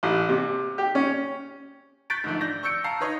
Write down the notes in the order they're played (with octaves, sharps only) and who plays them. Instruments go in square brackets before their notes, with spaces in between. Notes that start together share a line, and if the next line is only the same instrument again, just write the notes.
[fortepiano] A1
C3
G4
C#4
[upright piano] C#6 F#6 G6 A6 B6 D7
G#2 D3 F3 A3
D5 G6 A#6
C#6 E6 G6 C#7 D7
F5 A5 A#5 C7
D#4 B4 C#5 D#5